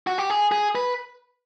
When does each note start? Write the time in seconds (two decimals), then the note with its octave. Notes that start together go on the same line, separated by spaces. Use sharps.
0.07 F#4
0.18 G4
0.30 G#4
0.52 G#4
0.75 B4